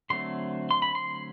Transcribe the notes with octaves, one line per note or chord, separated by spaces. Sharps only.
D3 F#3 A3 C4 C6
C6
B5
C6